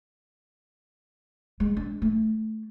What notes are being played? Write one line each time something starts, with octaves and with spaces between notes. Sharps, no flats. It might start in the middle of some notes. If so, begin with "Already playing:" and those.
G#3
D4
A3